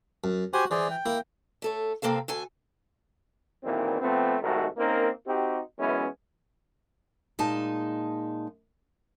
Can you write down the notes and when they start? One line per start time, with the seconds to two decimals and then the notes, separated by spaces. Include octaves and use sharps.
0.24 F#2
0.54 F#4 G4 C5 G#5
0.71 E3 G#4 C5 D5
0.91 G5
1.06 A#3 E4
1.62 A3 A4 C#5
2.02 C3 A#3 C4 A4 F5
2.28 D2 A4 G#5
3.64 B1 E2 A#2 D#3 E3 C4
4.01 F3 A3 B3 C4
4.41 C2 G#2 D#3 A3 F#4 A4
4.77 A#3 C4 C#4 D#4 A#4
5.27 C4 D#4 F#4 G4
5.79 F#2 E3 G#3 B3 C#4 E4
7.39 A#2 G#3 D#4 A5